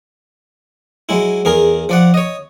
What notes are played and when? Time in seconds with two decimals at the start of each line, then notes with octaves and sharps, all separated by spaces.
1.09 F#3 G#3 E4
1.45 E2 G#4 A#4
1.89 F3 D5 F#5
2.14 C#5 D#5